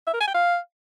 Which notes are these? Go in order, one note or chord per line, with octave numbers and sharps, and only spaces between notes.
E5
A#4
G#5
G5
F5